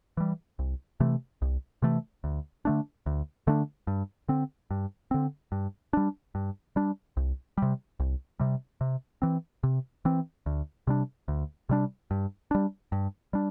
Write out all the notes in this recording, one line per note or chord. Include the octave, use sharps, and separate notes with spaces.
E3 G3
C2
C3 E3 A3
C2
C3 E3 A3
D2
D3 A3 D4
D2
D3 A3 D4
G2
D3 C4
G2
D3 C4
G2
G3 D4
G2
G3 D4
C2
C3 G3
C2
C3 G3
C3
E3 C4
C3
E3 C4
D2
C3 G3 D4
D2
C3 G3 D4
G2
G3 D4
G2
G3 D4